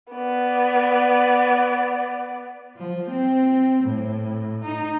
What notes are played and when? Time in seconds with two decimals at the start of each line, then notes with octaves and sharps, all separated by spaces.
0.13 B3 D5
2.77 F3
3.10 C4
3.83 A2
4.64 D#4